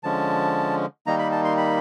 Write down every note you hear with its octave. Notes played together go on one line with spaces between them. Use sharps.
D3 F3 G#3 C#4 A5
D#3 G3 A#3 D#4 A#5
B5
A5
C6
B5